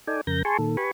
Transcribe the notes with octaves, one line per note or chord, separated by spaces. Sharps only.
D#4 A4 D5 G5 G#5
F2 C#3 A#4 G6 A#6
G#4 G#5 A5 C6 C#6
A#2 D#3 A4
G4 B4 G#5 B5 C#6